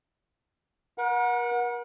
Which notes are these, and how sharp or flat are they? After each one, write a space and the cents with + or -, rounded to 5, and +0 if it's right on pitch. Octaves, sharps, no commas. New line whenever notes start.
A#4 +40 F#5 -20